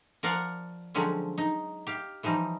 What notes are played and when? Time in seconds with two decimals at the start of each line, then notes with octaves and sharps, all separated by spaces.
0.23 F3 A#4 D5 F5 F#5
0.94 D3 F3 F#3 G#3 C4 C#4
1.38 D#4
1.87 G4 F5
2.23 E3 F3 G3 D#4